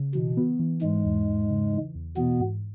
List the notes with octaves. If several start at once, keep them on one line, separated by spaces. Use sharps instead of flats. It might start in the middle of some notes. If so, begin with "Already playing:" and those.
Already playing: C#3
B2 E3
B3
E3
G#2 E3 G#3
E2
E2
C#3
E3
E2
B2 E3 B3
G#2